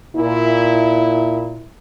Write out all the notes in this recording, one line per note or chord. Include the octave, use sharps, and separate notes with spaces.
A#2 E4